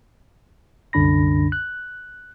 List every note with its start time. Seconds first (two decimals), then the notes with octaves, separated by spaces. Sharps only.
0.93 C2 F#2 D3 D4 B5 A#6
1.52 F#6